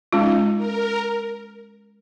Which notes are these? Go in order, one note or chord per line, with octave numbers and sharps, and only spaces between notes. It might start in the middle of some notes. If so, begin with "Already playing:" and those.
G#3 C#4 D#4 F4
A#4